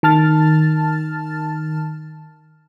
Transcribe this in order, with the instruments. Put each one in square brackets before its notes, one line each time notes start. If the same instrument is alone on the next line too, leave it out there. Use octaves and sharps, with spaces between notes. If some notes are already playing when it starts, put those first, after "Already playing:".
[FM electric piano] D#3 A5 F6 A6